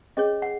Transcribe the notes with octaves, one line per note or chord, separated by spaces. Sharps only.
C#4 G#4 C#5 D#5
F#5